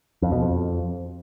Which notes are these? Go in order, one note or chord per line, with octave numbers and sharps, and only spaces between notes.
F2
B2
F2